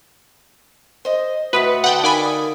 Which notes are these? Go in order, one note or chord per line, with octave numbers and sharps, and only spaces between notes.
C5 D#5
A2 F#4 B4 E5 F#5 B5 D#6
D3 F#5 G5 A5
D#4 A#4 D5 F5 G#5 B5
D#6